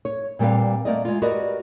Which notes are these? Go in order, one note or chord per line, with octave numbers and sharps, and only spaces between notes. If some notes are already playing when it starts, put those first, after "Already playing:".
C#5
A#2 G3 C4 B4 F5
A3 A#3 D5 D#5
G#3 F4
F#4 G4 A#4 B4 D5 D#5